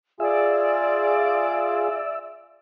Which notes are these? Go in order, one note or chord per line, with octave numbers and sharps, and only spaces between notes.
F4 G#4 D5 E5 E6